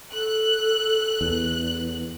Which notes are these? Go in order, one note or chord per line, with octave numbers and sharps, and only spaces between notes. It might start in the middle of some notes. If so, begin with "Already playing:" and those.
A4 F#6
E2